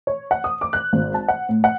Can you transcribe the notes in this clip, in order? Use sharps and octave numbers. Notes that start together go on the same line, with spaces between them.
C#5
F#5
D#6
D6
F#6
G#1
A5
F#5
A2
F#5